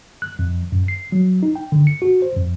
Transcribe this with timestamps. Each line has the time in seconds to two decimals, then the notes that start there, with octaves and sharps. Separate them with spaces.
0.22 F#6
0.39 F2
0.72 F#2
0.88 C7
1.12 F#3
1.43 D#4
1.56 G5
1.72 D3
1.87 C#7
2.02 F#4
2.22 C5
2.37 F2